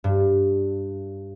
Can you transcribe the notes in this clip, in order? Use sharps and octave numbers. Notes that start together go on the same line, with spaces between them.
G2